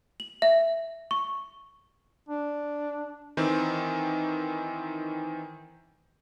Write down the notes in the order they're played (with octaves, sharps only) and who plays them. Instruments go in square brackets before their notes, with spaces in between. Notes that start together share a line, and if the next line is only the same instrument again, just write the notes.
[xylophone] F#7
E5
C#6
[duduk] D4
[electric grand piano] D#3 E3 C4